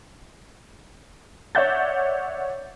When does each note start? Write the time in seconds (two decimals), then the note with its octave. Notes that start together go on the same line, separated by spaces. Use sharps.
1.55 C#5 D5 E5 F#5 G6 A6